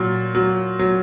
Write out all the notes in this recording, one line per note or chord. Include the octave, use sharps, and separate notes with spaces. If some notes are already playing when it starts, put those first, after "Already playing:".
Already playing: A#2 F#3
F#3
F#3